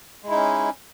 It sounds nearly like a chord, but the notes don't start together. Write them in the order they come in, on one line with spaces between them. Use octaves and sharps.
G#3 E4 D#4 C#4